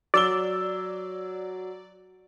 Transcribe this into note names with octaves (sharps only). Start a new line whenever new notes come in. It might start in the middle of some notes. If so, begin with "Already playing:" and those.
F#3 D5 E6 G7